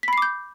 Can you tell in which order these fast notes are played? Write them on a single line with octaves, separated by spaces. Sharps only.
B6 B5 C7 D6 G6